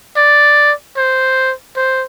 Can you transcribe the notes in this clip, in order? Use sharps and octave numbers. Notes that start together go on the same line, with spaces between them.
D5
C5
C5